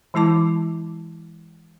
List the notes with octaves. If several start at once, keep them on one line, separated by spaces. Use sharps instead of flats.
E3 G#3 E4 A5 D6